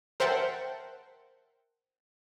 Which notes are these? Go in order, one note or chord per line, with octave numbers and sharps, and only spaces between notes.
A#4 C5 E5 F#5 G5 A5